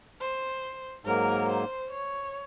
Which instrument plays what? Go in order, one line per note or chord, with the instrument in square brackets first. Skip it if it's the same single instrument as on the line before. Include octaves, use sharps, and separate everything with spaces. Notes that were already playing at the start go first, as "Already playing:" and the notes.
[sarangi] C5
[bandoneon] G#2 F#3 A#3 [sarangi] A#4
[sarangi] C5
C#5